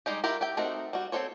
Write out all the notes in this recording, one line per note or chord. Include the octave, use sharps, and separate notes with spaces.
G3 G#3 D#4 G4
E4 F4 G4 A#4
G4 E5 G5
A3 C4 D#4 F#4 A#4
G3 F#4
C4 D#4 A4 C5 C#5